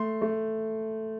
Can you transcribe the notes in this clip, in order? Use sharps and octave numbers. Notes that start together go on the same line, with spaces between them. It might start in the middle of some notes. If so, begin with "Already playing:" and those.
Already playing: A3 C6
A3